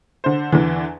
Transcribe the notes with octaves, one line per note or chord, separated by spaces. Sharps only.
D3 C5
E2 D3 E3